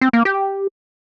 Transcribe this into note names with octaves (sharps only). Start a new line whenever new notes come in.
C4
A#3
G4